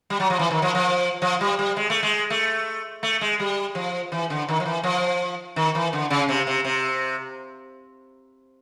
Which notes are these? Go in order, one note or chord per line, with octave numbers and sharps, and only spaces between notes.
G3
F#3
F3
E3
D#3
F3
F3
F3
G3
G3
G#3
A3
G#3
A3
A3
G#3
G3
F3
E3
D3
D#3
F3
E3
F3
D#3
E3
D3
C#3
C3
C3
C3